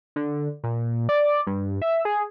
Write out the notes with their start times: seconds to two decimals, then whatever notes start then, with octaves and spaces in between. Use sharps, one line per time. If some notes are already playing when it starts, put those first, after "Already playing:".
0.16 D3
0.64 A#2
1.09 D5
1.47 G2
1.82 E5
2.05 G#4